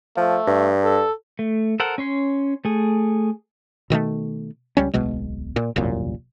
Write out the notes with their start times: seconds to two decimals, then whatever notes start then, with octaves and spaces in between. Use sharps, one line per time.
0.17 F3 A3
0.47 G2
0.84 A4
1.39 A3
1.80 A4 A#4 C5 F#5
1.98 C#4 C#5 C6
2.65 A3 G#4
3.90 B2 D#3 G#3 A3
4.77 C#2 G3 C#4
4.94 D1 B1 B2 G#3
5.56 A#2
5.76 E1 C2 F#2 A#2